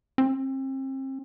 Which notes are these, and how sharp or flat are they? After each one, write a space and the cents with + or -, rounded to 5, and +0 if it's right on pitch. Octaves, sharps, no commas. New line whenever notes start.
C4 +35